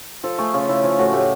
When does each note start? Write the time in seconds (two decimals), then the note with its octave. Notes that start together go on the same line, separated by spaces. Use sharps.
0.24 F3 A4
0.38 A3 G#4
0.53 C#3 F4
0.68 C#3 E4
0.84 F3 F4
0.99 A2 F#4
1.13 A2 G4